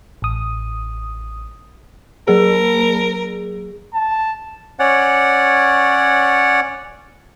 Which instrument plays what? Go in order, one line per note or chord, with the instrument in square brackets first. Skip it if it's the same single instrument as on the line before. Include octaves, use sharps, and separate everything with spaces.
[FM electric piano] A1 D#6
[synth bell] F#3 A#3 G#4 [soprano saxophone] A#4
[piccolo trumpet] A5
[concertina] C#4 C#5 D5 F#5